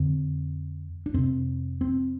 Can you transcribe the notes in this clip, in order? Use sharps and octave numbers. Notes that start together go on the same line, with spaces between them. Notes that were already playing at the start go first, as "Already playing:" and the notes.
Already playing: F2 D3 C4
D4
F2 C3 C4
C4